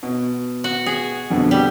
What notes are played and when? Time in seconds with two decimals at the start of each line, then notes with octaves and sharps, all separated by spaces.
0.03 B2
0.64 F#4
0.86 G#4
1.30 F2 B2 D3
1.51 G3